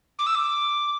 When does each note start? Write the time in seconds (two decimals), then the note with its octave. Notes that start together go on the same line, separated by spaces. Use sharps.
0.19 D6
0.27 E6
0.35 D6